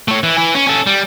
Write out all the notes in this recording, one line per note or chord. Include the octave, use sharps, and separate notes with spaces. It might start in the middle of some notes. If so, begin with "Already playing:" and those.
A3 C#5
E3
E3
C#4
C#4 A4
G3